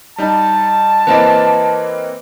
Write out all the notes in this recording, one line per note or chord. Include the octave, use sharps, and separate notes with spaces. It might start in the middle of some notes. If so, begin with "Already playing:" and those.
G3 D#4 A5
E3 A#3 C4 B4 C5 D#5